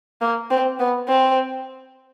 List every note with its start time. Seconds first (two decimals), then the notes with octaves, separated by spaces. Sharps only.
0.21 A#3
0.50 C4
0.79 B3
1.08 C4